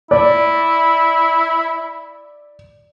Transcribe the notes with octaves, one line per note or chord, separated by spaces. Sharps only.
E4 D5